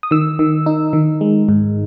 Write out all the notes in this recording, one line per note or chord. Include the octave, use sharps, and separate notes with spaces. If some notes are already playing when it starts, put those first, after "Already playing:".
D#6
D#3 E6
D#3
D#4
D#3
G#3
G#2